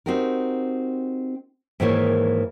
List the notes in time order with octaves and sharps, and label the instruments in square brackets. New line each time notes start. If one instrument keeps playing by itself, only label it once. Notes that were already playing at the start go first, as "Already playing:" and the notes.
[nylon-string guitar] C4 D#4 F#4 G4 A#4
G#2 D#3 E3 A#3 C#5